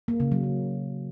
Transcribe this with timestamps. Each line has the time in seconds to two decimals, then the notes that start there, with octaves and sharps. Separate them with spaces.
0.08 A#3
0.20 C#3
0.32 F#3
0.43 C#3